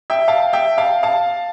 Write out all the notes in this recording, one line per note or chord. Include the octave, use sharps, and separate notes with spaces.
E5 G5
F5 A5
E5 G5
F5 A5
F5 A5